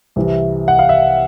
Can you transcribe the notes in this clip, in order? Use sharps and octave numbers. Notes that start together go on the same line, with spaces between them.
C2 C3 E3
F#5
F5
E5